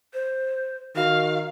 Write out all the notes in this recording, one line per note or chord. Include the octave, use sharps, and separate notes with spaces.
C5
D#3 F#4 F5